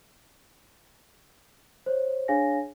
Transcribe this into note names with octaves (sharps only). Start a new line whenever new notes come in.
C5 C#5
D4 G#4 C#5 F5 G#5 A#6